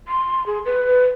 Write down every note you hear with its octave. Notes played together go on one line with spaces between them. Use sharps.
C6
G#4
B4